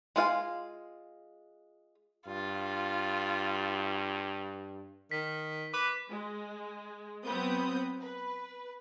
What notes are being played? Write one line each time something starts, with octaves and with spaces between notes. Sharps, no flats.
G#3 F4 F5 G#5
G2 F4
D#3 B6
B4 D6
G#3
F#3 B3 C4 B4 D#6 G6
B4